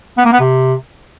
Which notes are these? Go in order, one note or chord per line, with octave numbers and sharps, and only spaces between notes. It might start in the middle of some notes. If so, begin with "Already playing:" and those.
B3
A#3
B3
C3